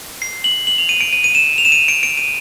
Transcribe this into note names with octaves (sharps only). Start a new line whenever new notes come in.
C7
F#7
F#7
F7
D#7
D7
D#7
D#7
E7
F7
E7
D#7
D7
D7
D#7